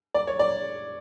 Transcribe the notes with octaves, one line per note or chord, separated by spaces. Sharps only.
D5
C#5
D5